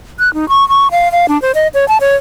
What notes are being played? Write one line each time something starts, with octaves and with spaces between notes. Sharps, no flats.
F#6
D#4
C#6
C#6
F5
F5
D4
C5
D#5
C#5
A5
C#5